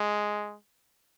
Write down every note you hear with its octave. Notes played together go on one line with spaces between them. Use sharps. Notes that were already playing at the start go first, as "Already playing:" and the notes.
Already playing: G#3